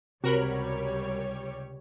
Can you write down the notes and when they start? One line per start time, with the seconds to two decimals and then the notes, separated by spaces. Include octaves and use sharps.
0.24 C#2 C3 G3 F#4 A#4 C#5 B5